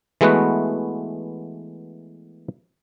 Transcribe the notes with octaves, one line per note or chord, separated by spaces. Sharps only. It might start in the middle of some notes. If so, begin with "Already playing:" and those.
E3 G#3 A3 B3 F#4 B4